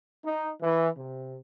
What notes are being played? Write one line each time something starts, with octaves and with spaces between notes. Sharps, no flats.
D#4
E3
C3